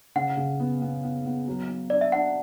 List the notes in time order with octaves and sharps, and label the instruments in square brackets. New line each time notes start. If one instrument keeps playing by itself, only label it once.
[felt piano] C#3 [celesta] F#5
[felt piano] C#3
B3
B3
B3
B3
F#3
B3
[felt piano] D4 [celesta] D5
[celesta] E5
[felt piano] D4 [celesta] F#5